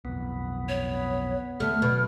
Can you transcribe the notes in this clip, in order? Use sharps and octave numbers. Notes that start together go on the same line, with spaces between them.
B1 F2 B3
C#5
D#1 D3 A3 F6
B2 F#3 A3